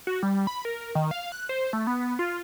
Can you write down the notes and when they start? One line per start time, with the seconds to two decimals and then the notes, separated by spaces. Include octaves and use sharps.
0.07 F#4
0.23 G3
0.47 B5
0.65 A#4
0.95 D#3
1.11 F5
1.32 F#6
1.49 C5
1.73 A3
1.87 B3
2.19 F4